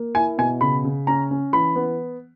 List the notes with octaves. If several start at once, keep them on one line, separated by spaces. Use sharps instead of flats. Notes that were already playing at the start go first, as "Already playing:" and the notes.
Already playing: A#3
E4 G#5
B2 G#5
C#3 B5
C#3
C#4 A#5
C#4
E3 B5
B3